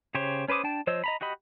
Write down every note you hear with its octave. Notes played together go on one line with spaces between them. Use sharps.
C#3 G4 C5 C#5
C#4 B4 C5 D6 D#6
D4 G5 A5
F3 C5 C#5 D#5 E6
D#5 A#5 B5
F#4 G4 D#5 B5